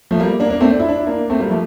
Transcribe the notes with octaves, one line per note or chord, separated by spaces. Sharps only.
F3 A3
G3 A#3
A#3 D4
A#3 D4
A3 C4
D4
E4
D4
E4
A#3 D4
A3 C4
G3 A#3
F3 A3